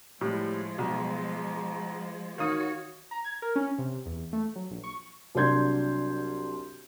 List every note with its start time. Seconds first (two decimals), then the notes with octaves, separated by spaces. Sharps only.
0.21 A2 F3 G3 G#3
0.78 B1
2.38 D#3 F#4 C#5 F5 D#6
3.11 A#5
3.25 G#6
3.42 A#4
3.56 C#4
3.78 C3
4.06 E2
4.33 A3
4.56 F#3
4.70 A#1
4.84 C#6
5.35 C2 F#3 D4 C6 G6 G#6